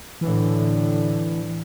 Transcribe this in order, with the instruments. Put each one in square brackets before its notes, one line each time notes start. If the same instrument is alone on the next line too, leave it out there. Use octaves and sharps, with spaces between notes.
[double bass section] A2 D3 [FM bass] E3